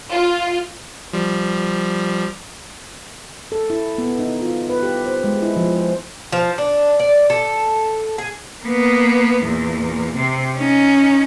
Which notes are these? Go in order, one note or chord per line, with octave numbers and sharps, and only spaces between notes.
F4
F3 G3
A4
E4
B3
D#4
F4
B4
G4
C5
G#3
E4
F3
C5
F3
D4
D5
A4
G#4
A#3 B3
E2 A#2
C3 C4
C#4 D#4